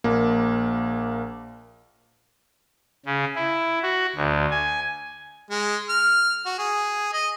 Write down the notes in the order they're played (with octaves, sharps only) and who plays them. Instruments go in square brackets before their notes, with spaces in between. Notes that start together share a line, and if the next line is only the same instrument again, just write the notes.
[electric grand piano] A#1 A#3
[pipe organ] C#3
E4
F#4
D2
G#5
[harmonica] G#3
F6
F#4
G#4
D#5